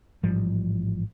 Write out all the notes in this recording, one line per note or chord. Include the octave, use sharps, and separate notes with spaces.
A1 G#2 F3 G3